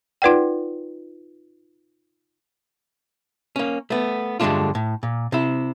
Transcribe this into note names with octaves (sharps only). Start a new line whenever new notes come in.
D#4 F4 B4 D5 F#5 G5
A#3 C#4
A3 B3
G2 D3 G#3 A3 D4 F4
A2
A#2
C3 E4